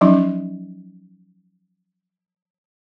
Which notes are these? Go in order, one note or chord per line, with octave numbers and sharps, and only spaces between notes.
F3 F#3 C#4 D#4